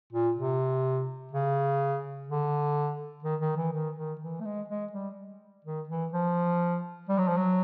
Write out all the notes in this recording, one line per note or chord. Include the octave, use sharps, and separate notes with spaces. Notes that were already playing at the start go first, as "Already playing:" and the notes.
A#2
C3
C#3
D3
D#3
D#3
E3
D#3
D#3
E3
A3
G#3
G#3
G3
D#3
E3
F3
G3
F#3
F3
F#3